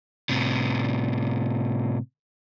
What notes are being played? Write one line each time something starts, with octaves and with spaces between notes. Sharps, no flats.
A2 C3